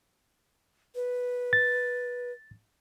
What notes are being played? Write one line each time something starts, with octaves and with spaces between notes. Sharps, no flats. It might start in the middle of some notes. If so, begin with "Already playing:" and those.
B4
A6